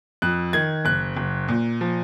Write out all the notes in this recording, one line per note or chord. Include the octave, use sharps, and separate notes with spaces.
F2 F#6
D#3 G#6
F#1 F#6
F#1
A#2
F3